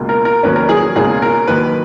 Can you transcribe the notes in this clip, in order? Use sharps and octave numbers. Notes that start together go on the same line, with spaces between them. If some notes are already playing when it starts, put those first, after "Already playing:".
Already playing: C#2 B2 A#3
A#4
A#4
F1 D#2 D#3 F#3 C#4 B4
A#4
G#4
C#2 B2 A#3 C#4 G#4
A#4
D#2 D#3 F#3 B4